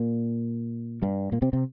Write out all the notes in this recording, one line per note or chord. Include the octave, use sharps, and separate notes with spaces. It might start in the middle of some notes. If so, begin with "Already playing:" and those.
Already playing: A#2 A#3
G2 G3
A#2 A#3
C3 C4
C3 C4